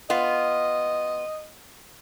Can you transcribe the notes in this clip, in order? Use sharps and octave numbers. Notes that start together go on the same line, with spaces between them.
B3 F4 D#5